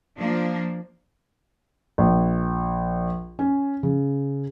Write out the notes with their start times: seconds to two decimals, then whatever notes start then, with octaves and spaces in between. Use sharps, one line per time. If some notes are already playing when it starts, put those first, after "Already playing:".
0.17 F3 A#3 D4
1.98 A#1
3.39 C#4
3.83 C#3